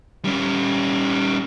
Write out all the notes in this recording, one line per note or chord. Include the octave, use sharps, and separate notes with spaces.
G3 C#4